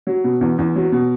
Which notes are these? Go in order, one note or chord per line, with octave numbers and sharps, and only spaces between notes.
F#3
B2
E2
E2
F#3
B2